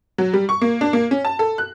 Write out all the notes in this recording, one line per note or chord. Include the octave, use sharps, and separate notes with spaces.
F#3
G3
C#6
A#3
D4
A#3
C#4
A5
A4
F#6